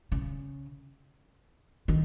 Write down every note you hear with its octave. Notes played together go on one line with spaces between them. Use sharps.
C#3
D#3